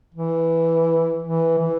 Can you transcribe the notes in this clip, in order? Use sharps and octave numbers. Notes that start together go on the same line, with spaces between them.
E3
E3
E3